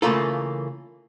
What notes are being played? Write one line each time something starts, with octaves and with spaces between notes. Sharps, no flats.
C#3 E3 A3 A#3 F4 A4